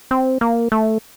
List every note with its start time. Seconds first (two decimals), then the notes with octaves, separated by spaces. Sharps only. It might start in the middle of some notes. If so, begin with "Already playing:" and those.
0.11 C4
0.41 A#3
0.72 A3